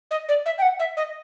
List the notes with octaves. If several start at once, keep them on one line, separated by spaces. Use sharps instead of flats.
D#5
D5
E5
G5
F#5
E5
D#5